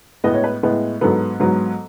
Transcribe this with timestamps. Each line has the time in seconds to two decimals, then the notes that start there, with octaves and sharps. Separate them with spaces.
0.24 A2 G#3 B3 D#5
0.34 C#5
0.44 B4
0.63 A2 G#3 B3
1.01 G#2 F#3 B3 A4
1.40 G#2 F#3 B3